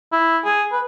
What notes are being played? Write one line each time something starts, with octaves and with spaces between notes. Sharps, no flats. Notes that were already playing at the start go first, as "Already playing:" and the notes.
E4
G#4
B4